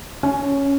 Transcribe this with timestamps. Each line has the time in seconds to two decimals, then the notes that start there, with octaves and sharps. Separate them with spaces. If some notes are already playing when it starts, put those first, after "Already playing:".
0.23 C#4